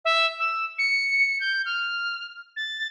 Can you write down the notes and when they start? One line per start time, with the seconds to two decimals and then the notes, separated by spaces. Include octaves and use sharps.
0.05 E5
0.40 E6
0.78 C#7
1.40 G6
1.66 F6
2.56 A6